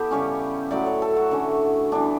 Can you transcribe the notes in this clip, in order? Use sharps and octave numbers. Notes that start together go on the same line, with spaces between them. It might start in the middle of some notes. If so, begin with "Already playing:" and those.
Already playing: B3 E4 G4 A4
C#3 G3 C#4 C#5
A2 F#3 B3 D5
C#5
A4
F#4
D3 A3 C#4
E3 G3 B3 D4